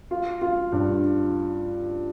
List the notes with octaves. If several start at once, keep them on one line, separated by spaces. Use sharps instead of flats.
F4
F4
G2